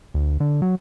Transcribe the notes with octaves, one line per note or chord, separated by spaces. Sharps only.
D2
D3
F#3